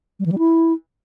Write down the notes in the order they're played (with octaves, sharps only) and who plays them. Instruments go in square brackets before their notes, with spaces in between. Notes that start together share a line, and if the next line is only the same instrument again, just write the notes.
[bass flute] G3
E3
G3
E4